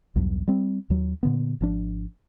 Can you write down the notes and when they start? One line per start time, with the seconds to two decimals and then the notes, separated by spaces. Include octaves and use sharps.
0.16 B1 E2 G2 F#3
0.48 G3 C4
0.90 D#2 F#3
1.23 A#2 D3 B3
1.61 G#1 F3 D4